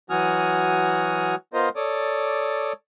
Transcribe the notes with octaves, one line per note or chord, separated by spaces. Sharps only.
E3 F#3 F#4 G#5 D#6 F6
B3 F4 A#4 C5 D#5
A4 C#5 D5 D6 D#6